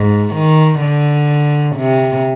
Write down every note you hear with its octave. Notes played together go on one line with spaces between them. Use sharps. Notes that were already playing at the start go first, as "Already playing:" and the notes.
Already playing: G#2
D#3
D3
C3